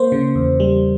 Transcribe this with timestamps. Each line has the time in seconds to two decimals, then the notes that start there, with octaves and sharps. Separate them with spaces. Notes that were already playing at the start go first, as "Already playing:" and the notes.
Already playing: A#3 C5
0.12 C#3
0.35 E2
0.60 G3